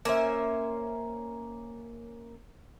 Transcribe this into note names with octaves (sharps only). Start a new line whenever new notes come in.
A#3 C#4 C5 E5